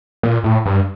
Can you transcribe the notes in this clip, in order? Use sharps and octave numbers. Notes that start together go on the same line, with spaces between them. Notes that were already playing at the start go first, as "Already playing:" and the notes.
A#2
A2
G2